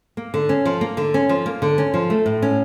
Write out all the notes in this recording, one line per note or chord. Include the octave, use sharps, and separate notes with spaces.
A#3
D3
C#4
F3
A#3
D3
C#4
F3
A#3
D3
C#4
F3
A3
A2
C#4